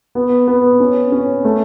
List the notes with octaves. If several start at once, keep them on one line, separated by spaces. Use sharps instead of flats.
B3
B3
C#4
C#4
A3